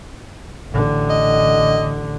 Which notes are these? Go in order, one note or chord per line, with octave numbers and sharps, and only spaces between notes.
A1 D3
D#5